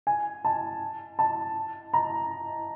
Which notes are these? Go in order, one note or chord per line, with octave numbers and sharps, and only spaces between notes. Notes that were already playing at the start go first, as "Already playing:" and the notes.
G#5
A5
A5
A#5